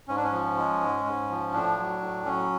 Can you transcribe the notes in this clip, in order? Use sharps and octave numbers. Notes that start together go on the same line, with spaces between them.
G#2 C#4
D4
C#4
F3
G#3
G#2
G#2
F3
A2 D4
F#3
A2
F#3 C#4